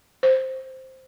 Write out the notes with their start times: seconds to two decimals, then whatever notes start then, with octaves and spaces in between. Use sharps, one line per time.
0.23 C5